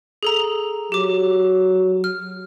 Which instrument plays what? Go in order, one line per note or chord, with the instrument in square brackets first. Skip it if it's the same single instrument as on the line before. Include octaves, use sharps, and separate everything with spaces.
[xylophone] G#4 A4 A#5
[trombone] F#3 [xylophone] G4 D6
[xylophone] F6